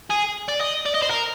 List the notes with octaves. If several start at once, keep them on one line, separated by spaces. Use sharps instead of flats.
G#4
D5
D#5
D5
D#5
C5
A#4